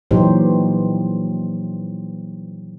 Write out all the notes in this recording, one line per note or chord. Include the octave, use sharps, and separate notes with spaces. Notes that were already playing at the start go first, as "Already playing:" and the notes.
A#2 E3 F#3 D#4 G4 C5